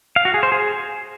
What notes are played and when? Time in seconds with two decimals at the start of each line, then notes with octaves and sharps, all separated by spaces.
0.16 F5
0.25 F#4
0.34 G#4
0.43 C5
0.52 G#4